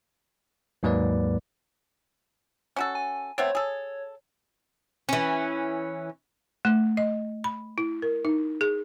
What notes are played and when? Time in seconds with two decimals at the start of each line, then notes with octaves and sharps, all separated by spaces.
0.83 D#2 G#2 F#3 A#3 B4 D5
2.76 C#4 F#4 A4
2.95 G#5
3.38 A3 B3 C4 C#5
3.55 G#4 A4
5.09 E3 C#4
6.65 A3
6.97 D#5
7.44 B5
7.78 E4
8.02 A#4
8.25 D#4
8.61 G#4